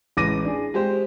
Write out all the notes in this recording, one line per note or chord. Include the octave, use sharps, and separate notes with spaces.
A1 G#3 D6 A#6 D#7
D4 G#4
G#3 G4 C5